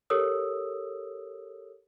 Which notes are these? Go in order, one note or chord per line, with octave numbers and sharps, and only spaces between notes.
G4 A4 A#4 C#5 D#6 E6